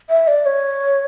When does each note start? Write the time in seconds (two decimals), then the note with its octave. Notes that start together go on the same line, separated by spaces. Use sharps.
0.10 E5
0.28 D5
0.46 C#5